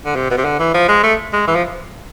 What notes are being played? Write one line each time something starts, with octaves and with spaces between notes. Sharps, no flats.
D3
C3
B2
C3
D3
E3
F3
G#3
A3
G#3
E3
F3